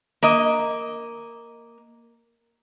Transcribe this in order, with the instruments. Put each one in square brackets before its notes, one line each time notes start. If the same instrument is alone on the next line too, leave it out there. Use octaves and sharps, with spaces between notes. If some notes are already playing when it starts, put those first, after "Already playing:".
[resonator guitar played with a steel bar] A#3 D#5